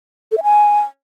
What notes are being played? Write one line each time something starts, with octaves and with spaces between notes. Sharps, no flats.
A4
E5
G#5